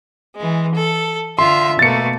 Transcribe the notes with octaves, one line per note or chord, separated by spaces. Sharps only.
E3 G#3
A4
D3 F4 E5 C6
B2 A3 A#3 A6 C#7